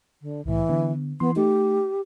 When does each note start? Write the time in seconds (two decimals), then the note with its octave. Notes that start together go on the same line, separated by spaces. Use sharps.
0.22 D3
0.45 C2 A2 E3
0.69 D3 B3
1.20 E3 B3 C6
1.36 A3 D#4 G4